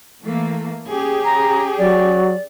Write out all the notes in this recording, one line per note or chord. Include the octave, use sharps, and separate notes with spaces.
E3 A3 A#3
C#4 G4 G#4
A#5
F#3 D5